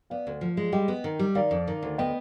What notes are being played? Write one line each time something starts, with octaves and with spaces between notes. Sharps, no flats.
B3 D5 F5
D2
F3
G#3
G3 D#5 G5
B3
D#3
G3
D#3 D5 F5
F2
D#3
D2
B3 D#5 G5